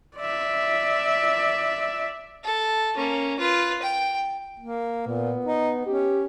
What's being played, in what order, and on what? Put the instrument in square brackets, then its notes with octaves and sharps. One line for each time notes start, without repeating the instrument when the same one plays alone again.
[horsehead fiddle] D5 E5
[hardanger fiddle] A4
A#3 C#4
F4 B4
G5
[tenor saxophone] A#3
[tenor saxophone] A#2 [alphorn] B3
[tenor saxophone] D#4
[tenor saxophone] C#4 [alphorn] G4